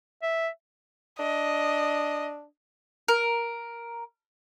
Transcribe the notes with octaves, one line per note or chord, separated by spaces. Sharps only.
E5
D4 D#5
A#4